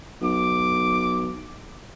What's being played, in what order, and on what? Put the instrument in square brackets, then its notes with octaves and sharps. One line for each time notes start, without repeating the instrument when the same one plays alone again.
[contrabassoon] B1 [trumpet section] D6